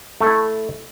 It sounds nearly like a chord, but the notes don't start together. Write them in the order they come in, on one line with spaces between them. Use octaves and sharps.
A3 A4 E4